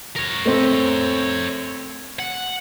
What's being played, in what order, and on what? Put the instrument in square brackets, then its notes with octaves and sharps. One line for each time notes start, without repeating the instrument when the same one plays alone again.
[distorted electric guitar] A#4 C#5
[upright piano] A3 C4
[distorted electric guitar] F#5